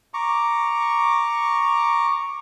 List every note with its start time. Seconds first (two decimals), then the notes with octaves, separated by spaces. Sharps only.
0.14 A#5 C#6 D6